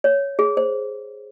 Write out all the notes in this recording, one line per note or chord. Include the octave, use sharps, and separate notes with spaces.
C#5
G#4
C5